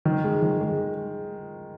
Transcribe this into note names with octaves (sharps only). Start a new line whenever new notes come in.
D#3
G#3
D#3
G#3